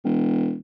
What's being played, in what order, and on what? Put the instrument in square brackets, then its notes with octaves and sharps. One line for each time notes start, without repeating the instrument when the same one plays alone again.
[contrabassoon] E1